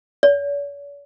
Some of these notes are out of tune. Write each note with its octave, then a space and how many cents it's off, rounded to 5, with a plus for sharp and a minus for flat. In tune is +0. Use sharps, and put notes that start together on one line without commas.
C#5 +45